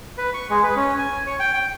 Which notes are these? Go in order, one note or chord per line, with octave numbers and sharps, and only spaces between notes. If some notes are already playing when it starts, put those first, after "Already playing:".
B4
C#6
G#3
B4
C#4
G#5
C#5
G5
G5